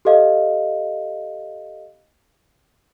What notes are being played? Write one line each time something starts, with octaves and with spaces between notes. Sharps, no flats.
G4 A4 D#5 F5